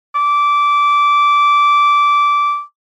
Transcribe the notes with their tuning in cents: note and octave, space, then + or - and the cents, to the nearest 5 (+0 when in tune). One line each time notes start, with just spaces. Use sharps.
D6 -15